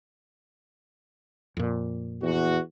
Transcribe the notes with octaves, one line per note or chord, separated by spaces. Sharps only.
F2 A#2
E2 F#4